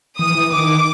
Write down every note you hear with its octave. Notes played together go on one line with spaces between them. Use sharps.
E3 D#6
E3
D#3 D6